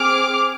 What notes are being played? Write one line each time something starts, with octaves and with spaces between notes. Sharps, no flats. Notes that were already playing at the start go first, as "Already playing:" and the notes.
Already playing: C4 G#4 D6 F6